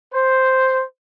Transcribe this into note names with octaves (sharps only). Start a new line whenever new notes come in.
C5